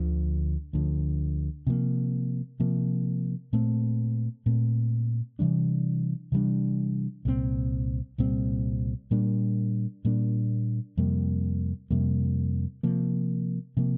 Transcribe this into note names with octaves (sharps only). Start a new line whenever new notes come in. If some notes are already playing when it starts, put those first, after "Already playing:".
Already playing: D2 D3 F3
D2 D3 F3
C3 F3 A#3
C3 F3 A#3
A#2 A3 C4
A#2 A3 C4
C3 E3 G3 D4
C3 E3 G3 D4
C2 A#2 G3 C4
C2 A#2 G3 C4
A#2 G3 A#3 D4
A#2 G3 A#3 D4
F2 C3 G3 A#3
F2 C3 G3 A#3
C3 F3 A#3
C3 F3 A#3